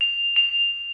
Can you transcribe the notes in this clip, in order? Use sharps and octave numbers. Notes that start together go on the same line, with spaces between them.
F7
F7